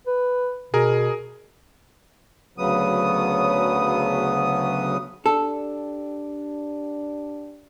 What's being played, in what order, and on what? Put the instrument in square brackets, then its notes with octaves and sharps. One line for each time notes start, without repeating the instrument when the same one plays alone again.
[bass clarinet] B4
[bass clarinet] B2 [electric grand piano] G#4 A#4
[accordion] D2 C#3 F#3 B3 D#6
[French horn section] D4 G4 [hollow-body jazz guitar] A4